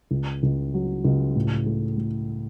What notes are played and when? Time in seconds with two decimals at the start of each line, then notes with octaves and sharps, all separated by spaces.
0.11 C#2
0.43 C#2
0.74 F#3
1.05 C#2
1.36 A2
1.66 A3
1.97 A3